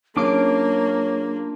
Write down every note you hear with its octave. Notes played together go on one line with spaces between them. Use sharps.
F#3 A#3 C#4 D4 F4 G#4 C#5 D6